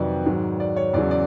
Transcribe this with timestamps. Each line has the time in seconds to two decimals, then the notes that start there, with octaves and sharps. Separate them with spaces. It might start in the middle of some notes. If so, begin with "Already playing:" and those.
Already playing: F2 C3 D#3 F#3 B4 D5 D#5
0.25 G#2 D#3 F#3
0.60 D5
0.76 C#5
0.93 E2 C#3 F#3 D5
1.11 D5